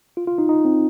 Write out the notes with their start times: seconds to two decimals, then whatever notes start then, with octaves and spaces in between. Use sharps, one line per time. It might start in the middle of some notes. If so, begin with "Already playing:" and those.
0.17 F4
0.27 F4
0.38 D#4
0.49 D#4
0.65 C4